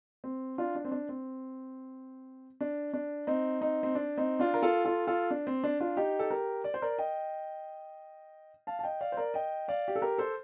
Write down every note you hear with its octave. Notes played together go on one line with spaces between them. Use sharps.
C4
D4 F4
D4
C4
D4
C4
D4
D4
C4 D#4
C4 D#4
C4
D4
C4 D#4
D4 F4
A#4
F4 A4
F4 A4
F4 A4
D4
C4
D4
D4 F4
D#4 G4
A4
G4 A#4
D5
C5
A#4 D5
D#5 G5
F5 A5
A5
D#5 G5
D5 F5
C5
A#4 D5
D#5 G5
D5 F5
G4
A4
G4 A#4
A4 C5